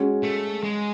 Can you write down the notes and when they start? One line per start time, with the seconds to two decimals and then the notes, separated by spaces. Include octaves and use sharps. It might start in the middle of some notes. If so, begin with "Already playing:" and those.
Already playing: G#3 C#4 F#4
0.23 A3
0.63 G#3